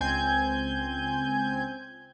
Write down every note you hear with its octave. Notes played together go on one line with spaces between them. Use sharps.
C#2 C4 G#5 G6 G#6